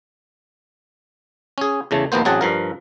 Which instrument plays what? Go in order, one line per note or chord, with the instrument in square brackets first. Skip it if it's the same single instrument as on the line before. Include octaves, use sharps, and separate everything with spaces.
[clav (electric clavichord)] C#4 G#4
E2 C#3 A3
A#1 D#2 A#3 B3 C5
A1 F#3 C4 G#4 F#5 A5
G2 F3 A#4